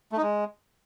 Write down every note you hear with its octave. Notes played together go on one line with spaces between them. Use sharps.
A3
D#4
G#3